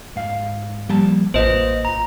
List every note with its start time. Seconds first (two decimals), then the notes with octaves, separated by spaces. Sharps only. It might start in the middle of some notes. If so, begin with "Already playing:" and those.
0.16 G#2 F5
0.89 F3 G3 A#3 A5
1.34 A1 A#3 F4 B4 C5 D#5
1.85 A#5